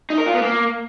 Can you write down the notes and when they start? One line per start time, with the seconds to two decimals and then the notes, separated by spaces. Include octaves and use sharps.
0.10 D#4
0.18 A#4
0.26 F4
0.34 B3
0.42 A#3